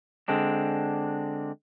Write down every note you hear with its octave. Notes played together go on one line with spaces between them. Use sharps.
D3 G#3 C4 D4